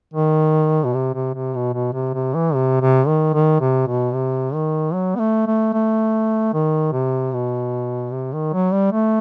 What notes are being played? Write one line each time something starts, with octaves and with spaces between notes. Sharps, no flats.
D#3
B2
C3
C3
C3
B2
B2
C3
C3
E3
C3
C3
D#3
D#3
C3
B2
C3
D#3
F#3
B3
A3
A3
A3
D#3
C3
B2
C3
D#3
F#3
G3
A3